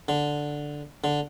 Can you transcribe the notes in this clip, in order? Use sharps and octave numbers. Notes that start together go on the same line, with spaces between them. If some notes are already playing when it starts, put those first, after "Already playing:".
D3
D3